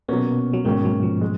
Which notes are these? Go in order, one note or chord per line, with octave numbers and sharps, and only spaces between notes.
B2 F#3 A#3 B3 C#4
F#3
G#2 D#3 G#3 A#3 C#4
F#3
F3
G#3